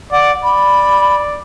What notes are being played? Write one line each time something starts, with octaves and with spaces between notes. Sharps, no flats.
D5 F#5
D5 B5